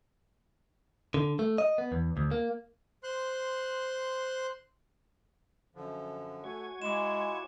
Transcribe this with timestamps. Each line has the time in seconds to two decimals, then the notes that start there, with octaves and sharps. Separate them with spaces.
1.14 D3
1.39 A3
1.58 D#5
1.78 B3
1.92 E2
2.17 D2
2.31 A#3
3.03 C5 C6 F#6
5.75 F#2 D3 F3
6.44 A3 F#4 C#5 G#5
6.82 G#3 E4 F4 D6 E7